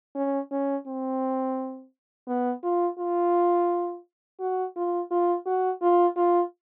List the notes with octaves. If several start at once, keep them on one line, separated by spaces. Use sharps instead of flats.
C#4
C#4
C4
B3
F4
F4
F#4
F4
F4
F#4
F4
F4